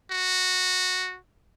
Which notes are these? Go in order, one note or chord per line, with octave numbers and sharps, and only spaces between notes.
F#4